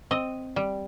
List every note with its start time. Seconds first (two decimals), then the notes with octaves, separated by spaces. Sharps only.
0.11 C4 D#5
0.56 G3